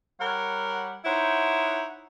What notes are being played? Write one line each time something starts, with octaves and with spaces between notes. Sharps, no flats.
G3 A#4 C#5 F#5
D#4 E4 C5 C#5 F#5